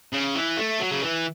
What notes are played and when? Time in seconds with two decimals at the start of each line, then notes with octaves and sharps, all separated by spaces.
0.13 C#3
0.35 E3
0.57 A3
0.79 F#3
0.91 C#3
1.02 E3